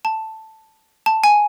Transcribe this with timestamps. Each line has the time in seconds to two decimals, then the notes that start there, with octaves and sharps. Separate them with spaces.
0.05 A5
1.06 A5
1.24 G#5